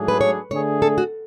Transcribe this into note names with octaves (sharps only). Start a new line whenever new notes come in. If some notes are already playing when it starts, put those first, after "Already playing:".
Already playing: G#2 F#3 A3 D4 G#4
B4
C#5
D3 A3 D4 G#4 C#5
A4
F#4